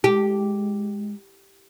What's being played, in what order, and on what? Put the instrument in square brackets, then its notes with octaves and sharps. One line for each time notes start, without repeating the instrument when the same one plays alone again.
[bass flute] G#3 [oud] G4